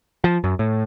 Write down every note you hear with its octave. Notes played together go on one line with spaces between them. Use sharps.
F3
F#2
A2